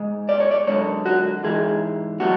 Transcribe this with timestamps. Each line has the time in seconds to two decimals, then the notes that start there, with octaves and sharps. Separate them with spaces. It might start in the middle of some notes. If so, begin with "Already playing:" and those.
Already playing: G#2 G#3
0.29 D5
0.40 C#5
0.51 D5
0.67 F#2 D3 G#3 C#5
1.06 F#4
1.44 G#2 E3 G#3 G#4
2.20 A2 F#3 F#4